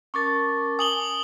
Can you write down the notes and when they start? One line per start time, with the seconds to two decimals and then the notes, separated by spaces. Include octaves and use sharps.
0.14 C#4 A#4 A5 C#6 D6 A6
0.79 G#5 D#6 F#7 G7